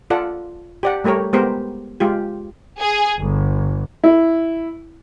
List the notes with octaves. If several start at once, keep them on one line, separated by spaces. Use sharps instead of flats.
F4 A4 D5 F#5
G4 D5 F#5
G3 A3 G4 A#4 C#5
G#3 B3 G4 A#4 C5
G#3 F4 G4
G#4
G1
E4